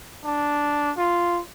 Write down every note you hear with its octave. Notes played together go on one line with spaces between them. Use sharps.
D4
F4